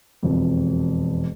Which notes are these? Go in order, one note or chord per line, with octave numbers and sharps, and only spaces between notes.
E1 F2